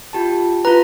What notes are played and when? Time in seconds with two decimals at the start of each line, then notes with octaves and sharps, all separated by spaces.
0.13 F4 G4 A5
0.65 F4 B4 A#5